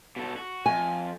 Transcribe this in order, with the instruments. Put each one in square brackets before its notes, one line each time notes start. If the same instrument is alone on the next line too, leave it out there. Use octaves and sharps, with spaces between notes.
[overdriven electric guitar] B2 A4
F#4
[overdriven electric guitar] F2 [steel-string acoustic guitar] G#5